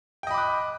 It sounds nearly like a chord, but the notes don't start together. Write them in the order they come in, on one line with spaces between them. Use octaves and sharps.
G5 D#5 B5 D6 F#6